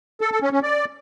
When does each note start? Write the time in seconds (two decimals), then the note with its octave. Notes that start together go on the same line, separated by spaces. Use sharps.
0.21 A4
0.31 A4
0.42 C#4
0.52 C#4
0.63 D5